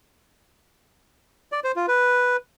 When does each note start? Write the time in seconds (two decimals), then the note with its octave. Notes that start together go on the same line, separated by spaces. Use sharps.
1.52 D5
1.64 C5
1.76 F4
1.88 B4